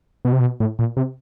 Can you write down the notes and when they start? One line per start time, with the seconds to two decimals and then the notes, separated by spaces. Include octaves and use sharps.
0.25 B2
0.32 C3
0.40 B2
0.60 A2
0.79 A#2
0.97 C3